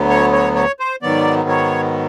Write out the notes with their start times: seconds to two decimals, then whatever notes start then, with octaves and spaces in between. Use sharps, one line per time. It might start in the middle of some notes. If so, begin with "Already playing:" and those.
Already playing: D2 D3 F#3 B3
0.10 C#5
0.33 C#5
0.56 C#5
0.80 C5
1.02 G#2 D#3 F#3 B3 D5
1.49 C#5